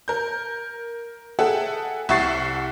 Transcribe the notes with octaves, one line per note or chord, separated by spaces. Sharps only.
A#4 G6
G#4 A4 E5 F#5 G5
C2 E5 F#5 C#6 A6 C7